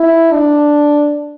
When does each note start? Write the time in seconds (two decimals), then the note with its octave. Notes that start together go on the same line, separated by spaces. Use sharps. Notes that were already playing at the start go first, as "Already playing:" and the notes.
Already playing: E4
0.32 D4